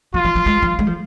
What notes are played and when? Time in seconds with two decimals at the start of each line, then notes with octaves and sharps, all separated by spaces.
0.14 F3 F4
0.25 F3
0.35 F3
0.46 G#3
0.62 F3
0.79 G#3
0.87 F3